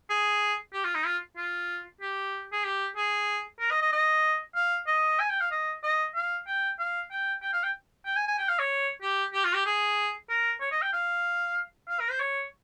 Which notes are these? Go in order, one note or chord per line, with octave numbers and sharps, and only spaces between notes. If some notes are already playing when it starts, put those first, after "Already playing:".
G#4
G4
F4
D#4
F4
F4
G4
G#4
G4
G#4
A#4
D#5
D#5
D#5
F5
D#5
G#5
G5
F5
D#5
D#5
F5
G5
F5
G5
G5
F5
G5
G5
G#5
G#5
G5
F5
C#5
G4
G4
F4
G4
G#4
A#4
C#5
D#5
G5
F5
F5
A#4
C5
C#5